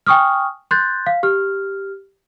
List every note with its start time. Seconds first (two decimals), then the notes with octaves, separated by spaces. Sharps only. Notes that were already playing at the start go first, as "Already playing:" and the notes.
0.06 G5 G#5 C#6 D#6 F6
0.71 C6 F#6 G6 A6
1.07 F5
1.23 G4 F6